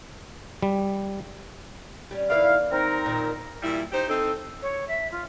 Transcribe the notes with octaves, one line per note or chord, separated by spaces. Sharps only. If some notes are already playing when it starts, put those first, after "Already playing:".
G3
G3 C#4
D#2 E4 B4 D5 F5
C4 D#4 A#4
A#2 D#3
A#2 G3 E4
D#4 G4 C5
C4 D#4 A4
C#5
E5
F4